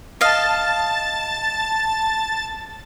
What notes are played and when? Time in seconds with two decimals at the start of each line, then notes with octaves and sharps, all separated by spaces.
0.21 D#5 F5 A5 A6